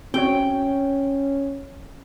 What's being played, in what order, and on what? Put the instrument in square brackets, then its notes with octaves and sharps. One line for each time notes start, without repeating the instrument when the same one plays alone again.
[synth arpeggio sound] C4 F#4 C#5 [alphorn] C#4 [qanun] G5